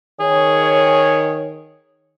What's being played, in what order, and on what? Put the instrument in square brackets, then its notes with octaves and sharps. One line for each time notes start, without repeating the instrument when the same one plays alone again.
[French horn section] D#3 C#5 [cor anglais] G#4